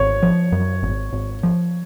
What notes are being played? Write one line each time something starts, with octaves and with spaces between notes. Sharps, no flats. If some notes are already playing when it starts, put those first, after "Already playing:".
Already playing: G#1 C#5
F3
F#2
G#1
G#1
F3